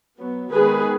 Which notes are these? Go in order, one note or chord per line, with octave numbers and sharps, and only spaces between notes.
F#3 B3
D#3 G#3 B3 G#4 B4